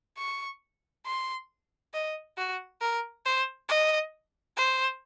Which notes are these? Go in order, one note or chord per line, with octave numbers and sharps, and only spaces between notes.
C#6
C6
D#5
F#4
A#4
C5
D#5
C5